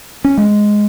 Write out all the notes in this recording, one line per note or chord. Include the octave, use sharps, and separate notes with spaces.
C#4
G#3